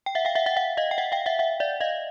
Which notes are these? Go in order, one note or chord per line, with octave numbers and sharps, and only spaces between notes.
G5
E5 F#5
F5 G5
E5 F#5
E5 F#5
E5 F#5
D#5 F5
G5
E5 F#5
F5 G5
E5 F#5
E5 F#5
D5 E5
D#5 F5